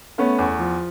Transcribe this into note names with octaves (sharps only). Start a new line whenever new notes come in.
A3 B3 C#4
E2
F3